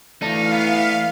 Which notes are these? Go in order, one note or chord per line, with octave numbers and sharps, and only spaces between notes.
E3 A3 D#4 D5 F5 A5
B3